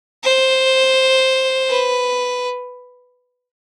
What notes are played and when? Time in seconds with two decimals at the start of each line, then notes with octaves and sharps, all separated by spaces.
0.24 C5
1.69 B4